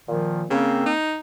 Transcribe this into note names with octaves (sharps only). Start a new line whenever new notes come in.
A#2 D#3 F3
C#3 A#3 C4
D#4